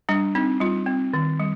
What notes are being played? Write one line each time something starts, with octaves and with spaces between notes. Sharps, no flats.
G3 D4
C4 D#4
G3 F4
C4
D#3
G3